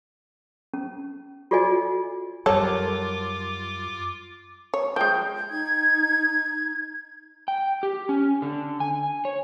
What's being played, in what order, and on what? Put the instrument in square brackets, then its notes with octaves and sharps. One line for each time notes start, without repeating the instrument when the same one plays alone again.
[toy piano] C#4
F4 F#4 A4 D5 D#5 G#5
[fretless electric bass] F#2 G3 [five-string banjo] F#3 A#4 C#5 [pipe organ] F4 D6 [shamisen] A4
[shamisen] C#5
[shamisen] F3 G#3 [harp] G5 [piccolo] G6
[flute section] D#4 G#6
[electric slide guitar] G5
G4
C#4
D3
G#5
C#5